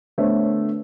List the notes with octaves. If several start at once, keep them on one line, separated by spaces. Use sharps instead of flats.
D3 A3 B3 C5 C#5